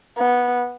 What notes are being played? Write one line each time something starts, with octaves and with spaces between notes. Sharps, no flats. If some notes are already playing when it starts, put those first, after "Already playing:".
B3